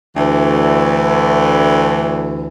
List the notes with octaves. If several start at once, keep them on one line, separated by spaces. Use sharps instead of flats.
D2 E3